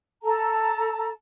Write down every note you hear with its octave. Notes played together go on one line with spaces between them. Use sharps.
A4 A5 A#5